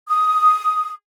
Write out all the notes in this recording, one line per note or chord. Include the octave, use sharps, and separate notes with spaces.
D#6